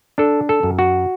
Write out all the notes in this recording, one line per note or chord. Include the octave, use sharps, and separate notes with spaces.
D4 A4
A4
F#2
F#4